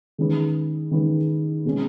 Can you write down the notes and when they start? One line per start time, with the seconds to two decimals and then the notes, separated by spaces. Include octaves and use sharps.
0.18 D#3 G#3 C#4 G#4 B4
0.91 D#3 G#3 C#4 G#4 B4
1.65 B2 G#3 C#4